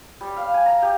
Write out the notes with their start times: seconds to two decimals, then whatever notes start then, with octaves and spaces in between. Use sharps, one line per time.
0.21 G3
0.36 F5
0.54 G#5
0.66 A#5
0.82 G4